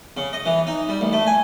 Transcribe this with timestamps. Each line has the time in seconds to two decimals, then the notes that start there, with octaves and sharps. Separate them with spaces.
0.17 C#3
0.33 D#5
0.46 E3
0.67 D#4
0.89 G3
1.01 A1
1.13 A3
1.27 G#5